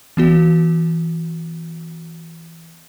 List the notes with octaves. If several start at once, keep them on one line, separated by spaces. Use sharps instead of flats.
E3 B3 F#4